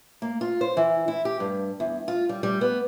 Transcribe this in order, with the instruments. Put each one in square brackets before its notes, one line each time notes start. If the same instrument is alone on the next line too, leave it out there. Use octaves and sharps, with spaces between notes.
[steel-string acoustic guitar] A#3
F4
C5
E3
E4
G4
G2
E2
F4
G3
G3
B3